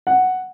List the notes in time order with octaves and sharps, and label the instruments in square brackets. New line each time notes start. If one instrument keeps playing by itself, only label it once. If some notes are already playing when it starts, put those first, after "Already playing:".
[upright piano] F#5